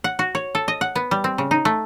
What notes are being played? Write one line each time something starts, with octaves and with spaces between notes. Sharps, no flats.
F#5
F#4
C#5
A4
D#5
F#5
B3
G3
C4
C#3
D#4
A3